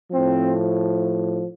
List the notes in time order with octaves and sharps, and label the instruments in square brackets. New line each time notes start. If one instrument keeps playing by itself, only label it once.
[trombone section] A2 F3 C4